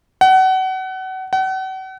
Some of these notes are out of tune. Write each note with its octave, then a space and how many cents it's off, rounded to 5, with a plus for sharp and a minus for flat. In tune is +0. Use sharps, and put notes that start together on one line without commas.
F#5 +30
F#5 +40